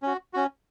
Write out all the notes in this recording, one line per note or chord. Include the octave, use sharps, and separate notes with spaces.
C#4 F#4
C#4 F#4